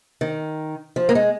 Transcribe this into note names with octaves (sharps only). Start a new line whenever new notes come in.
D#3
F3
A#3
G#3